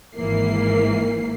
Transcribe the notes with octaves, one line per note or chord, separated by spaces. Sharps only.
G#1 G#2 E3 A#3 C7